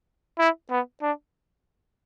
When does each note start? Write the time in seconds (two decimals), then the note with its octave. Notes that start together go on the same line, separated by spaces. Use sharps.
0.39 E4
0.71 B3
1.02 D4